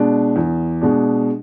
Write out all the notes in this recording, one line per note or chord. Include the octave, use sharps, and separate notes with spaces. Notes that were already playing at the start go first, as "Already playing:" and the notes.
Already playing: B2 G#3 D4
E2
B2 G#3 D4